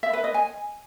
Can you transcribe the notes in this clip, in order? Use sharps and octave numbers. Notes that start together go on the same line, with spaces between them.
E5
B4
D#5
G#5